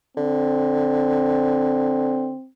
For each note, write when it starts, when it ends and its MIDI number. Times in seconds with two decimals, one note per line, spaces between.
0.17 2.33 50
0.17 2.48 60